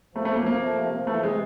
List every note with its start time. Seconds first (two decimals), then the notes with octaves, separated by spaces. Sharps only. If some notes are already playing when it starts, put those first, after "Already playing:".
0.15 F3 A3
0.25 A3
0.30 F#2
0.36 A#3
0.46 F3 A#3
0.61 A3
0.76 C3
0.92 F3
1.07 E3 A3
1.23 C3 G#3